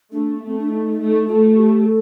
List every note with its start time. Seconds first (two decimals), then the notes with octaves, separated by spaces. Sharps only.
0.11 A3 D4
0.36 A3 A#3
0.47 C4
0.59 D4
0.69 D#4
0.98 A3
1.27 A3 F4
1.56 G4
1.86 A4